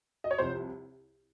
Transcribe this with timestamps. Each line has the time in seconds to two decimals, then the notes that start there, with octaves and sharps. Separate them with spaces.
0.24 D#5
0.31 C#5
0.38 C2 C3 F3 C5